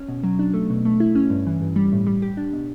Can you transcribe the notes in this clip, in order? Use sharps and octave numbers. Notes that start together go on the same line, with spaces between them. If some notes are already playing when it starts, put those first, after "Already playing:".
Already playing: C#4
B2
F#3
D4
A3
B2
A3
E4
C#4
G2
E3
G2
G3
A2
G3
G4
D4
B2